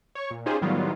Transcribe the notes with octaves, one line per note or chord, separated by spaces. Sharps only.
C#5 C#6
A#2
C#4 D#4 F4 G4 G#4 C5
A2 D#3 F#3 G3 B3 F4